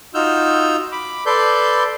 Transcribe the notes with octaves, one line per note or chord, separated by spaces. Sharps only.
D#4 F4 F#4 E6 F6 G6
B5 D6
A4 B4 D5 C6 G6